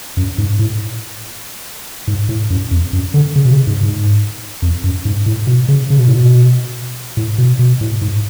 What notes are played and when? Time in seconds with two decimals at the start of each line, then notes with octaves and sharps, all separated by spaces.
0.17 F#2
0.38 G#2
0.59 A2
2.07 G#2
2.29 A2
2.50 F#2
2.71 F2
2.93 F#2
3.14 D3
3.36 C#3
3.45 B2
3.51 C#3
3.67 G#2
3.83 G#2
4.62 F2
4.84 F#2
5.05 G#2
5.26 A2
5.47 B2
5.68 C#3
5.90 C#3
5.98 B2
6.07 A2
6.15 B2
7.17 A2
7.38 B2
7.59 B2
7.81 A2
8.01 G#2